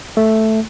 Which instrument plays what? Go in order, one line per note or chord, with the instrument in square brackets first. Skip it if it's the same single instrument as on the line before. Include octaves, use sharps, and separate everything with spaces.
[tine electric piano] A3